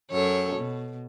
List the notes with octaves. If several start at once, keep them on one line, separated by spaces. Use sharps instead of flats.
F#2 A4 C#5
B2